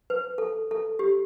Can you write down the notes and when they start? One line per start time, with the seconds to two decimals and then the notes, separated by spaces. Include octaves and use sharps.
0.10 B4
0.38 A4
0.71 A4
0.99 G4